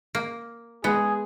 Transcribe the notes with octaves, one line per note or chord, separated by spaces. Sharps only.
A#3
G#3 B3 G#4